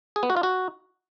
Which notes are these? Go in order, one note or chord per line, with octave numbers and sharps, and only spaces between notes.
G#4
B3
F#4
F4
F#4